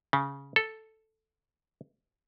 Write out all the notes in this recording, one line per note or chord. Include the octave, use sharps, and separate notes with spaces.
C#3
A4